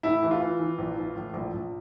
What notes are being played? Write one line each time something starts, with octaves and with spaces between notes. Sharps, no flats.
A2 E4
E3
F4
E3
E3
A#1
E3
A2
A#1
A#1